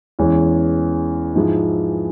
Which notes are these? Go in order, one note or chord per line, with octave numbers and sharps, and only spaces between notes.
E2 E3 G#3 C#4
G#2 F3 G#3 E4